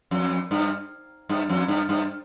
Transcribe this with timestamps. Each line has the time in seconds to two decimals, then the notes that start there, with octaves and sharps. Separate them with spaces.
0.11 F2
0.51 G2
1.29 G2
1.49 F2
1.68 G2
1.89 G2